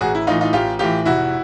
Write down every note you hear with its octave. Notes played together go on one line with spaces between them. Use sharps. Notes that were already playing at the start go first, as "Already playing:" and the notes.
A1 F#4 G#4
E4
A2 E3 D#4 F4
D#4 F4
A1 F4 G4
A2 E3 F4 G4
F1 E4 F#4